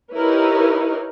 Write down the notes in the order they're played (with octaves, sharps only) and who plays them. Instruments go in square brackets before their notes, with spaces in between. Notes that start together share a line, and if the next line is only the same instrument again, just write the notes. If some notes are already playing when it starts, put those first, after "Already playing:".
[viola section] D#4 E4 G4 A#4 B4 C#5